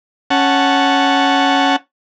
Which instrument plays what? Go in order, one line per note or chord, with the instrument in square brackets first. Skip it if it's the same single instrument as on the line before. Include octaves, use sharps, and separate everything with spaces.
[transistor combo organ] C#4 F#5 A5